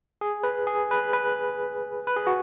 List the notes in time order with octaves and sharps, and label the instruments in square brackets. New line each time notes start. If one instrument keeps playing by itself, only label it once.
[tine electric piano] G#4
B4
G#4
B4
B4
B4
G#4
F#4